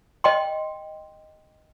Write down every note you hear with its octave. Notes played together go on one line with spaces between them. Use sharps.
D#5 G5 C6